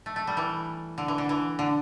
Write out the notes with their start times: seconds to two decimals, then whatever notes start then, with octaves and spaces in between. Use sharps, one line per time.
0.06 A3
0.16 A3
0.27 G3
0.37 E3
0.98 D3
1.08 E3
1.18 D3
1.29 E3
1.59 D3